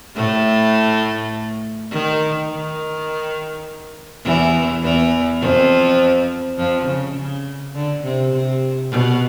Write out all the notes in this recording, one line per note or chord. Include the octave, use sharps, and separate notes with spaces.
A2 A3
D#3
D#3
E2 E3
E2 E3
F2 F3
F2 F3
C#3
C#3
D3
C3
C3
B2